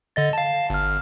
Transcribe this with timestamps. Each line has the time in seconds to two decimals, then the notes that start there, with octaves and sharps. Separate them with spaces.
0.16 D3 D#5 A6
0.33 F5 A5
0.70 G1 F6